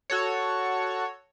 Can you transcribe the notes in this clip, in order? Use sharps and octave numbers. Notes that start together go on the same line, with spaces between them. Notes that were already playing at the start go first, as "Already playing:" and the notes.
F#4 A4 C#5